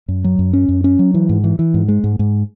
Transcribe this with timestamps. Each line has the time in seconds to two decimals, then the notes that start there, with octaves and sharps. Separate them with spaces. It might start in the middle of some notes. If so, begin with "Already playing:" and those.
0.08 F#2
0.24 F#3
0.39 F#2
0.53 C#4
0.69 F#2
0.84 C#4
0.99 F#3
1.14 E3
1.29 G#2
1.44 E3
1.59 E3
1.74 G#2
1.88 G#3
2.04 G#2
2.19 G#2